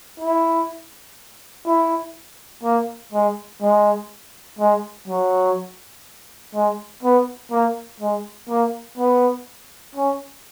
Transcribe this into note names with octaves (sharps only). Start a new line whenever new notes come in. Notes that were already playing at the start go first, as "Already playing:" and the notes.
E4
E4
A#3
G#3
G#3
G#3
F#3
G#3
B3
A#3
G#3
A#3
B3
C#4